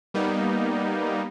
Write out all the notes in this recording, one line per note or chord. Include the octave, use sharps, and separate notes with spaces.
G3 A#3 B3 D#4